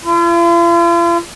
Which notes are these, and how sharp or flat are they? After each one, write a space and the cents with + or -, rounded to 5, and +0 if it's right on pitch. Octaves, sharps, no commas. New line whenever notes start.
F4 -45